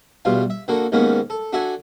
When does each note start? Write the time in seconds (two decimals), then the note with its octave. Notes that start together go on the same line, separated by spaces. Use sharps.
0.25 E2 G2 B2 F4 F5
0.50 E5
0.68 D3 A#3 F#4 A4
0.92 D#2 G#2 D#3 A#3 B3 C#4
1.30 A4
1.53 D4 F#4 A4 D5 E5 G#5